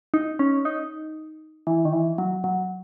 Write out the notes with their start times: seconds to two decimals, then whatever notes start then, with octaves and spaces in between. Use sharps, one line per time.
0.14 D#4
0.39 C#4
0.65 D#4
1.67 E3
1.85 D#3
1.93 E3
2.18 F#3
2.44 F#3